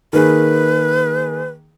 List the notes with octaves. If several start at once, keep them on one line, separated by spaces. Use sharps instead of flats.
D#3 A#3 G#4 B4